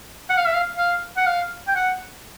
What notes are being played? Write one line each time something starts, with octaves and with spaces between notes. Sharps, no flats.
F#5
F5
E5
F5
F5
F#5
F5
G5
F#5